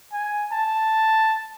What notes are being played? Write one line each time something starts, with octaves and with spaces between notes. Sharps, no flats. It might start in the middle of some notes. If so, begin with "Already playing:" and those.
G#5
A5